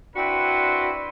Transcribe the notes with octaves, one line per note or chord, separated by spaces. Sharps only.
C4 D4 E4 F#4 B4 C5